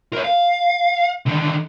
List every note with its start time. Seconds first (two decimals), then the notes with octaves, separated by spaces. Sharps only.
0.13 A#4 C#5
0.24 F5
1.26 D3 D#3